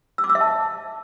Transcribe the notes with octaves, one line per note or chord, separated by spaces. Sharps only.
E6
D6
E6
E5
A5